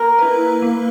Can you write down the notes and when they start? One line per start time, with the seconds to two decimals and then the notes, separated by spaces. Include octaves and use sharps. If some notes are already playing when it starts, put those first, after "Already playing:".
Already playing: A#3 A#4
0.19 E4 B4
0.62 A#3